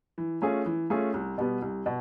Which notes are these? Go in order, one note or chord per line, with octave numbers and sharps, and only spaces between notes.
E3
A3 C#4 F4 G#4
E3
A3 C#4 F4 G#4
C2
B2 G3 B3
C2
B2